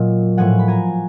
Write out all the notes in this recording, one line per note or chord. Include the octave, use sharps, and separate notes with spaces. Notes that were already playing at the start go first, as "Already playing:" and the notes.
Already playing: A#2 F#3 D#5
A2 F3 F#5 G#5
B5
G#5 A#5